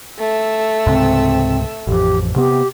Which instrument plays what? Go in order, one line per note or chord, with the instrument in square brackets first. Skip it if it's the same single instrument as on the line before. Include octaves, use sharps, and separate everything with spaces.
[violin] A3 E6
[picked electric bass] C#2 G#2 C3 [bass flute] C4
[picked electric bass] A1 F2 [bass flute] G4
[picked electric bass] C3 B3 [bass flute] G4